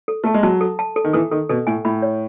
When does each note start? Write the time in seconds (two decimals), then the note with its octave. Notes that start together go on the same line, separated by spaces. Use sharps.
0.08 A4
0.24 A3 A5
0.34 G#3
0.43 F#3 A5
0.61 A4
0.79 A5
0.96 A4
1.04 D#3
1.13 E3 A4
1.31 D#3 A4
1.49 B2 A4
1.67 A2 G#5
1.85 A2 B5
2.02 C#5